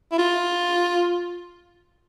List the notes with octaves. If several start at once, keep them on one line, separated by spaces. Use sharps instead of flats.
E4
F4